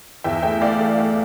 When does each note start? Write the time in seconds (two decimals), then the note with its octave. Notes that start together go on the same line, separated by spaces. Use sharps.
0.24 E2 E5 G5
0.43 A3 E5 G5
0.61 A3 D5 F5
0.79 A3
0.98 A3